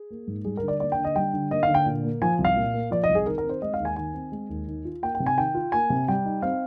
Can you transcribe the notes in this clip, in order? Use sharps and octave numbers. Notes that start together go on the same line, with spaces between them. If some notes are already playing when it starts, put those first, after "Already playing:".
Already playing: G#4
A#3
G#2
G3 G#4
A#4
D3
D5
A#3 D5
G5
D3
D#5
G3 G5
D3
A#3 D#5
F5
D3
G5
A#2
A#3
F3 G#5
C2
F5
A#2
A#3
F3 D5
D#5
C2
G#4
D#3 A#4
A#4
C4
C5
G#3 D#5
F5
D#2
G#5
D#3 G#5
C4
G#3
D#2
D#3
F4
A#3 G5
G5
C3
G#5
D#3 G5
F4
A#3 G#5
C3
G3 G5
D#4
C4 F5